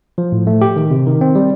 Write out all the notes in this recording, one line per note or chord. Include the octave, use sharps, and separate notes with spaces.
F3
A2
A3
G4
D#3
C3
D#3
C4
G3